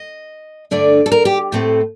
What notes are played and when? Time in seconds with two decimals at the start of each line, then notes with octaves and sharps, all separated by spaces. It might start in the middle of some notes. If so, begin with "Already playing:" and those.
Already playing: D#5
0.71 G2 D3 A3 D4 D5
1.06 A4
1.12 A#4
1.25 G4
1.52 A2 A3 C4